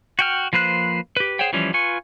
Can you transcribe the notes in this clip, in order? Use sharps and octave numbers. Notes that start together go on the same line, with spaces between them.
F#4 G5 F6
F3 A#3 B4 C5 F#6
G4 B4
G#4 C5 C#5 F#5 G5
E3 F3 G3 C#4
F4 B4 G#5 C#6